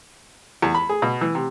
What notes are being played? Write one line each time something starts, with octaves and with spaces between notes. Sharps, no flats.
E2
B5
G#4
B2
E3
C3